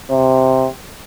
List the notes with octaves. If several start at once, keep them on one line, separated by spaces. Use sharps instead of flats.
C3